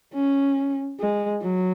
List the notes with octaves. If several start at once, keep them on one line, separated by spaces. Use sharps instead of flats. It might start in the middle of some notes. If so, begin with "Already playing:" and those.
C#4
G#3
F#3